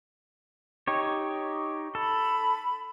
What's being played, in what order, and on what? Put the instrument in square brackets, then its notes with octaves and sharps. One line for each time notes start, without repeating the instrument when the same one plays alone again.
[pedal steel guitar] D#4 G4 C#5
[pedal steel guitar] A4 [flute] B5